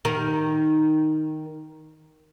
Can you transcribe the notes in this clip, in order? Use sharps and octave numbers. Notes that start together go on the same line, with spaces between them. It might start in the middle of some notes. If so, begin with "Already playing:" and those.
D#3 A#4